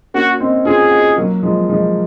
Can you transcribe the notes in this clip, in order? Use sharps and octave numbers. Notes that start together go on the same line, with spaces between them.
A#3 C#4 F#4
C4 D#4
C#4 F4 G#4
D#4 F#4
F#3 A#3
F3 G#3
F3 G#3